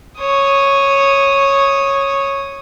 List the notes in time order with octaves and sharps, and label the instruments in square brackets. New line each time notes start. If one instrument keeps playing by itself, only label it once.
[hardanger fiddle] C#5 D#6